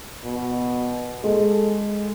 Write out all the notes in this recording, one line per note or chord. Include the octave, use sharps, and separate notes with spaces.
B2
G#3 A4